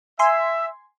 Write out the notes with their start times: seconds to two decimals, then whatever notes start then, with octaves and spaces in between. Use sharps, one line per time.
0.19 E5 G#5 C6